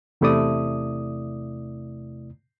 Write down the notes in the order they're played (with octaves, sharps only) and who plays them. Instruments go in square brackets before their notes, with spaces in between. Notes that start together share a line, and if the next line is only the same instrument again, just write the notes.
[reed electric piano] E2 C3 A3 E4 D5 D#6